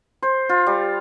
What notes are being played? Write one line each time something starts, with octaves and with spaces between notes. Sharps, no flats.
C5
F4
G3